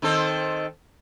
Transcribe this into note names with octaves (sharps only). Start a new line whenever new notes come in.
D#3 C4 A4